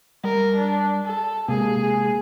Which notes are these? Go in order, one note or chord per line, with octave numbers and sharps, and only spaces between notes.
G3 A#4
D4
A4
C3 G#3 A#3 G#4